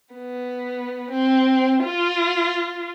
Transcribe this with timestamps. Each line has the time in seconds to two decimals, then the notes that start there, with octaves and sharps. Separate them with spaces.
0.15 B3
1.11 C4
1.83 F4